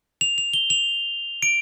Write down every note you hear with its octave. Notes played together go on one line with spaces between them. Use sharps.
F7
F7
G7
F7
D7